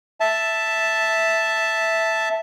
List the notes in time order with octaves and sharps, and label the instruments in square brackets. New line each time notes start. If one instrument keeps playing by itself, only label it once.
[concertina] E5 A5